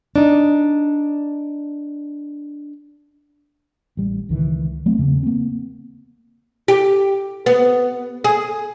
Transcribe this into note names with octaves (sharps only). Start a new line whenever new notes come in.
D4 D#4
A1 G3
C#2 D#3 E3
F#3 A3 A#3 C4
E2 C#3
A#3 C4
G4
B3
G#4